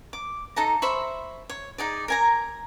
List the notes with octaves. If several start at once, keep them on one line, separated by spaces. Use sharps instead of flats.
D6
D#4 A4 A5 A#5
C5 E5 B5 C#6
C#5
D#4 G#4 D5
A#4 G#5 A#5